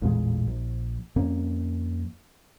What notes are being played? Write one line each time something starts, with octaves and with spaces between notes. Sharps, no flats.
A1 E2 A#2 G#3
A#1
F2 A#3 C#4